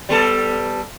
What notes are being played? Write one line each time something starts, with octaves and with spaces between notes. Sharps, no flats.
G3 B3 A4